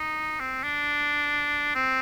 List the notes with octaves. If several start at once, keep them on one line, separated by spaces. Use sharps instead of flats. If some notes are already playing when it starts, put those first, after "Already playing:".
Already playing: D#4
C4
D4
C4